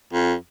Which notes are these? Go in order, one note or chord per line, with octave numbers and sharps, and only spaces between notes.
F2